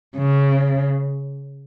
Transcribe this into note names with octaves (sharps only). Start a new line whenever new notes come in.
C#3